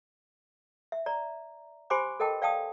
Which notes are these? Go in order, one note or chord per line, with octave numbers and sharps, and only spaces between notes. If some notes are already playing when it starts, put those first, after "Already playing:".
E5
D5 A#5
G4 C5 G#5 B5 C6 D6
A4 A#4 D#5 G5 A5
D5 F5 G5 A5 D#6